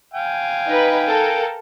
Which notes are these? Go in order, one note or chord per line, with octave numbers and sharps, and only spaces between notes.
F5 G5 G#5
D#4 B4
A4 A#4